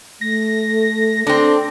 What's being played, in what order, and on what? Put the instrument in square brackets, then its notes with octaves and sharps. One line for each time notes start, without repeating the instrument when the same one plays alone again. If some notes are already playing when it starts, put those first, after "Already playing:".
[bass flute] A3 [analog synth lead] A#6
[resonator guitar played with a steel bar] C4 D4 [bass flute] A4